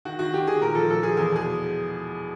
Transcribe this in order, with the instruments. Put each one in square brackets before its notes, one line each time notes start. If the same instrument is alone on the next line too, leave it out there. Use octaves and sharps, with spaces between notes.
[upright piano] D#3 F#4
D#3 F#4
D#3 G4
D#3 G#4
A#2 A#4
F3 A4
A#2 A4
F3 G#4
E2 G#4
B2 G#4